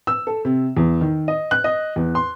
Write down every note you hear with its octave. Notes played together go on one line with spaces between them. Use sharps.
E6
A4
C3
E2
D#3
D#5
F#6
D#5
E2
C6